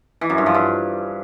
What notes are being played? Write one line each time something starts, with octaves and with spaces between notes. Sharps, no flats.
E3
F#2
G2
F3
G2